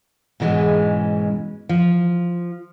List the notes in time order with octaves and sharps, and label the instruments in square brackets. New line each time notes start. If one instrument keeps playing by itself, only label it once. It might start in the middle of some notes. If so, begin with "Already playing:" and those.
[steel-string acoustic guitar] G#2 B2 E3 G#3 C#4
F3